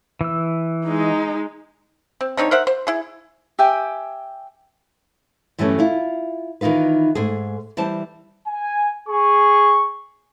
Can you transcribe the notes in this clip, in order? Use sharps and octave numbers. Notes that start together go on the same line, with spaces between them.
E3 E6
G#3 D#4
C4
D3 C4 D#4 C#5
A#4 C5 E5 F#5
C5
E4 G#4
G4 E5 G5 G#5
G2 E3 F#3 G3 A3 C#4
E4 F4
D#3 E3 D#4 F4 B4
G#2 A3 G#4
E3 G3 C5 A5
G#5
G#4 C#6